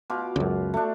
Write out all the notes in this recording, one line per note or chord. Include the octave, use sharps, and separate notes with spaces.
B2 F4 D6
C#2 F#2
A3 D4